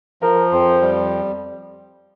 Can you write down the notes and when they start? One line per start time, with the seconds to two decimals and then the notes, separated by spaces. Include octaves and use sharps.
0.22 F3 A#4
0.52 F2 C5
0.82 G3